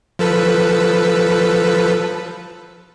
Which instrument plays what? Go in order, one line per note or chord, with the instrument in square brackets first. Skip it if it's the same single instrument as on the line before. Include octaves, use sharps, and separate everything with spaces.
[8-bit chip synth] F3 A4 B4